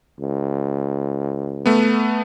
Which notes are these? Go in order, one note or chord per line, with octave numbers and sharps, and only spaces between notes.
C#2
A3 B3